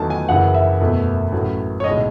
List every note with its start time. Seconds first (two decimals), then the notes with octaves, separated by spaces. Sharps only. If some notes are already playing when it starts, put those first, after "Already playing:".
Already playing: E2 D#3 F#3 A3 A5
0.10 G#5
0.29 F#1 F#2 C#3 E3 F#5
0.54 E5
0.81 F#1 E2 B2 A3
1.32 A1 A2 F#3 A3
1.80 C#5
1.84 B1 D#5
1.87 A2 G#3